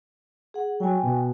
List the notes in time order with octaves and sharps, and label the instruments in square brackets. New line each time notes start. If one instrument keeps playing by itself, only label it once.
[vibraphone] G#4 F#5
[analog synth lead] F#3 [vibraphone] G5 G#5
[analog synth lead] B2